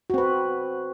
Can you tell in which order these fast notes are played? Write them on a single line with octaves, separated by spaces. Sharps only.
F#4 C4 B4